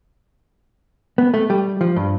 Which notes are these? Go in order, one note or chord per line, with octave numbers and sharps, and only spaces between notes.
B3
A3
G3
F3
G2